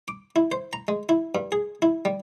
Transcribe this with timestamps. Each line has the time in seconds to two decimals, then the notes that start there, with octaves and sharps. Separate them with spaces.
0.08 D6
0.36 E4
0.52 C5
0.73 A#5
0.88 G#3
1.09 E4
1.35 G2
1.52 G#4
1.82 E4
2.05 G3